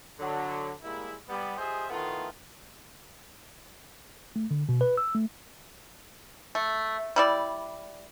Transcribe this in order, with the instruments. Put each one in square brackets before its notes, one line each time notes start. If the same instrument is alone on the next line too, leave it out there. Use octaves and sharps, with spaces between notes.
[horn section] D3 F#3
G3 G#3 A#3 E4
G3 B3
F4 G4 G#4 C5 D#5 E5
A2 D#3 A3 B3 F4
[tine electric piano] A3
D3
B2
B4
E6
A3
[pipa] A3
G3 E4 D5